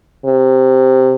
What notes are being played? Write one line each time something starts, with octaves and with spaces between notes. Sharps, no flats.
C3